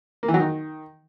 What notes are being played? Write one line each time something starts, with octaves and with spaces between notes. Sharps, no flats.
A#3
E3
F#3
D#3